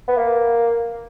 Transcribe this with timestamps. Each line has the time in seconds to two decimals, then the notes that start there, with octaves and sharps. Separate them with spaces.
0.08 B3
0.18 A#3